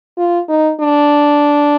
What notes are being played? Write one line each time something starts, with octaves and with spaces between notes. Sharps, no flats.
F4
D#4
D4